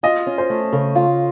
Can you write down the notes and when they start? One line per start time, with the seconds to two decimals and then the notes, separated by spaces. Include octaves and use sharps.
0.03 F4 D#5
0.27 C#4
0.38 C5
0.50 A3
0.72 C#3 A4
0.96 F4